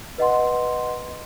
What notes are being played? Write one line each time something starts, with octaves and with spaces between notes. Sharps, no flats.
B4 D#5 F#5 C6